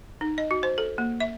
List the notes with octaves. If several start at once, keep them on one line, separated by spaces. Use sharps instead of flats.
D#4
D#5
F#4
C5
A4
A#3
E5